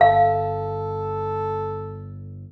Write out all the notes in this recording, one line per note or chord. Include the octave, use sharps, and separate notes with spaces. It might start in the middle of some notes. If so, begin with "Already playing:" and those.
G1 A4 F5